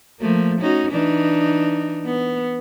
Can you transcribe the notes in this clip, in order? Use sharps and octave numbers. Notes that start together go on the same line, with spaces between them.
F3 A3 A#3
C#4 D#4 F#4
E3 D4 D#4
B3